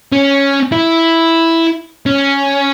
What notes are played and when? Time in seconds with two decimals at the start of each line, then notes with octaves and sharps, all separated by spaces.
0.12 C#4
0.72 E4
2.06 C#4